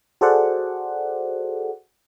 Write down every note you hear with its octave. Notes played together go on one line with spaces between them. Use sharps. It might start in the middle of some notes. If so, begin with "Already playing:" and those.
F#4 G#4 A4 C5 D5 F#5